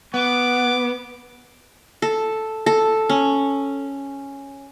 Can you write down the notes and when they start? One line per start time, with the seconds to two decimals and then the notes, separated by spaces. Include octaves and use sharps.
0.14 B3 F#5 D6
2.02 A4
2.66 A4
3.09 C#4